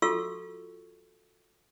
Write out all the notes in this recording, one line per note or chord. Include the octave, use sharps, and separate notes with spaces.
F4 F#4 A4 C#6 E6